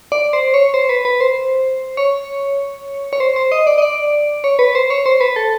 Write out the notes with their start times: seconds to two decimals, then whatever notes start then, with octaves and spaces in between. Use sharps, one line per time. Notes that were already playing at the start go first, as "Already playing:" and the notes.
0.12 D5
0.33 C5
0.54 C#5
0.74 C5
0.89 B4
1.05 B4
1.20 C5
1.97 C#5
3.13 C#5
3.20 C5
3.36 C5
3.52 D#5
3.67 D5
3.78 D#5
3.82 D5
4.44 C#5
4.59 B4
4.75 C5
4.90 C#5
5.06 C5
5.21 B4
5.36 A4